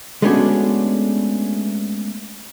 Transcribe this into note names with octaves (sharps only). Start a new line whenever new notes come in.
G#3 A3 B3 C#4 D4 F#4